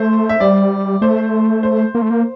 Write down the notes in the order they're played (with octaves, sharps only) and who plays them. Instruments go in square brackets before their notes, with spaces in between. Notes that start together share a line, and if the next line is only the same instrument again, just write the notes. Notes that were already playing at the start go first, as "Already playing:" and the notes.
Already playing: [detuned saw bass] A3 [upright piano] C5
[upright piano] E5
[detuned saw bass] G3 [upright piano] D5
[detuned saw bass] A3 [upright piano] C5
[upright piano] C5
[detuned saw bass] A#3
A3
A#3